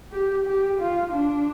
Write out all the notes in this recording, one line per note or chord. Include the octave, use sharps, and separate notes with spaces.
G4
G4
F4
D4